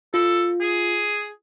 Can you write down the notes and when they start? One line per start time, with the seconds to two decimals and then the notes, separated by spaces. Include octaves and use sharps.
0.14 F4 A4
0.61 G#4